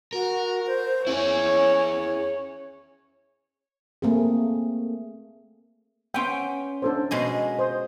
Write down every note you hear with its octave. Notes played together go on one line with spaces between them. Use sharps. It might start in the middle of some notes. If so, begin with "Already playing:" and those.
F#4 A#4
C5
C#4 E4 G#4 C#5
A3 A#3 C4 G#4
B3 C#4 G5 C6
D4 A4 C5
B2 G#3 D#5
C5 D#6